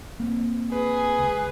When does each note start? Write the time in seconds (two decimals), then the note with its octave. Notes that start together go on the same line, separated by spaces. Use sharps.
0.20 A#3 C4
0.72 G#4 B4
1.19 C#2